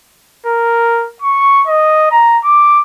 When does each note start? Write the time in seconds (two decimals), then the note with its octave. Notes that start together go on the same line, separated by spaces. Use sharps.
0.47 A#4
1.22 C#6
1.67 D#5
2.12 A#5
2.44 D6